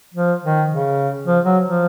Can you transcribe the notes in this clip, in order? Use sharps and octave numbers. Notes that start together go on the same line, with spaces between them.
F3
D#3
C#3
F3
F#3
F3